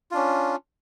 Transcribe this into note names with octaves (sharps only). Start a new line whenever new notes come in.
C#4 D4 F4